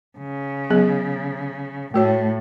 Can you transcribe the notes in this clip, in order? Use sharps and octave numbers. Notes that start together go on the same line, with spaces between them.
C#3
F#3 B3 G#4
A2 A3 F#4 C#5